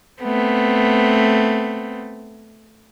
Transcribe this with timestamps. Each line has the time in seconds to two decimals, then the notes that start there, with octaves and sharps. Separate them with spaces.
0.22 A3 B3 C4